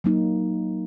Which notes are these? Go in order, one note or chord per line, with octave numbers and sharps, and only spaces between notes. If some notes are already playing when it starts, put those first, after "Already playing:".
F#3 A#3 D#4